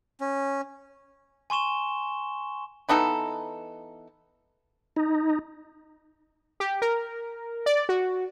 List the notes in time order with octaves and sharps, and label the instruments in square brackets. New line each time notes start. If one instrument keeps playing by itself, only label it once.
[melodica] C#4
[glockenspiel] G#5 C6 C#6 E7 G7
[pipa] E3 B3 D#4 A4
[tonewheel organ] D#4
[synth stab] G4
A#4
D5
F#4